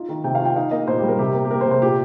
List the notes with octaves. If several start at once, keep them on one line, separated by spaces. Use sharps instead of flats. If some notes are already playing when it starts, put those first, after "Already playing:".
Already playing: D#4 F4
D#3
C3 G5
F5
F4
G5
D#4 F5
A#3 D#5
A#2 C5
G4
G3
A#4
C3 G4
A#3
G4
A#3 A#4
C5
C3
C5
A#2 G4